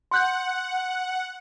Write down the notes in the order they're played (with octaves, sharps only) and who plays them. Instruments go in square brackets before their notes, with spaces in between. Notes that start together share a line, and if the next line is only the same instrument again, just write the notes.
[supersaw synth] F#5 [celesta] C6 F#6 G6